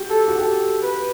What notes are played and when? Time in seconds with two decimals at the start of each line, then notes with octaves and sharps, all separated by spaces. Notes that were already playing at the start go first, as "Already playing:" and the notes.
Already playing: F#4 G4
0.10 A4
0.28 F#4
0.39 G4 A4
0.82 B4